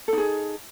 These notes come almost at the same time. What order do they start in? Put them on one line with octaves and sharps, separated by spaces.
A4 D#4 G#4